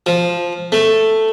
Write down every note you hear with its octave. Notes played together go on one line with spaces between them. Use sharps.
F3
A3